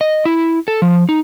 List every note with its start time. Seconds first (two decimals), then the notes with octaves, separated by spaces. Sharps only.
0.01 D#5
0.25 E4
0.68 A4
0.82 F3
1.09 D#4